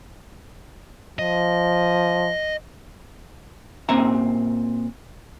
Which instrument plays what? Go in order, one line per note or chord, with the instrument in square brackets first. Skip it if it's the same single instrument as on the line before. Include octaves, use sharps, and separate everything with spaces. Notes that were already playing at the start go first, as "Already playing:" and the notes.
[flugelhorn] F3 [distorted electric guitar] D#5
[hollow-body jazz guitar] A#2 C4 C#4 E5 A#5